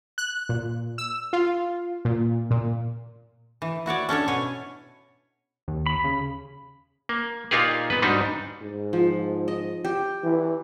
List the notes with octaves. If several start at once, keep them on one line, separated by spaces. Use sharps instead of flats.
F#6
A#2
E6
F4
A#2
A#2
E3
E4 F#4 C#5 D5
C#4 D4 A4 C#5
B2 C#5 G#5
D#2
B5
C#3
A#3
A#2 A#3 D#4 F4 G4 G#4
B3 B4
G#2 G3 D4 D#4 F#4
G#2
F3
D#5
G4
E3